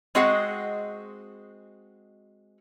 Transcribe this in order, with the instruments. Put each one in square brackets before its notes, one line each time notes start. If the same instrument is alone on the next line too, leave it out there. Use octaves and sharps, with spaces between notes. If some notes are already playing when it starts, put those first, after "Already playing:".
[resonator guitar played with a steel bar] G#3 C4 F#4 G#4 D#5 F#5